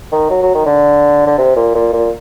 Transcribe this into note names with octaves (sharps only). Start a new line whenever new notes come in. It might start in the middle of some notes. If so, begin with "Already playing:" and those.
D#3
F#3
F#3
D#3
D3
D3
C3
A#2
A#2
A#2